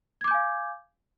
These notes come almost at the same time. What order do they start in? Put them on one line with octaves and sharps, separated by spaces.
G#6 D6 G6 G#5 F5